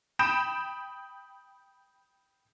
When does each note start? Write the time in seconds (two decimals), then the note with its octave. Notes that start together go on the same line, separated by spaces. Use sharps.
0.19 G5 B5 D#6 G6 D7 E7